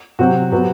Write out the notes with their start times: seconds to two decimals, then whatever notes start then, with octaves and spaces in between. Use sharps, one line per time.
0.19 C3 F#3 C4 F#4
0.52 C3 F#3 B3